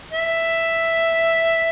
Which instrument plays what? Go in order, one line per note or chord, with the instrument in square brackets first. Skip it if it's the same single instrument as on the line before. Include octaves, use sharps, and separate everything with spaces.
[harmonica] E5